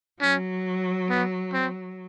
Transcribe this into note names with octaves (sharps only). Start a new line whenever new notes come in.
F#3 C#4
B3
C4